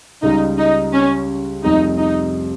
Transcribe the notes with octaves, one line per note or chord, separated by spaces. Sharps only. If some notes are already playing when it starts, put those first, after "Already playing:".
C#2 C#3 G3 D#4
D#4
C#4
F1 F2 C3 G3 D#4
D#4